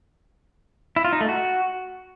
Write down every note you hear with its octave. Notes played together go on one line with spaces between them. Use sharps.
E4
F4
D#4
A3
F#4